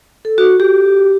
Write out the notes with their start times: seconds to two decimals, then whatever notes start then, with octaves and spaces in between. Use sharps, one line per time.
0.25 A4
0.38 F#4
0.60 G4